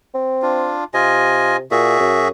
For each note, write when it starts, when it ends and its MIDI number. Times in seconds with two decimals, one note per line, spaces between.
0.14 0.74 60
0.42 0.84 62
0.42 0.84 65
0.94 1.62 48
0.94 1.57 65
0.94 1.57 75
0.94 1.57 80
1.71 1.96 46
1.71 2.28 66
1.71 2.28 68
1.71 2.28 76
2.00 2.29 42